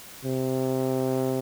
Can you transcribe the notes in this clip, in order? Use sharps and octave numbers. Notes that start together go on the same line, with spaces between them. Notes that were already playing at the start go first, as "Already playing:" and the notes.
C3